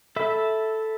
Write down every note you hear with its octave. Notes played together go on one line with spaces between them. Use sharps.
A4 E5 B5